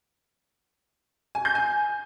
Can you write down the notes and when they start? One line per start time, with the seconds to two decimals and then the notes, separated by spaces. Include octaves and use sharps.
1.35 G#5
1.45 G6
1.55 G#5